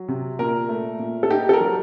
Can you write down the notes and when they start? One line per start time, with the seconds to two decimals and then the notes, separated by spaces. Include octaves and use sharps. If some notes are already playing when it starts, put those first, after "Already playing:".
Already playing: F#3
0.08 C3
0.39 A#2 A#4
0.69 A3
0.99 A#2
1.23 A4
1.30 D#4 G4
1.49 A4
1.53 A#4
1.60 F#3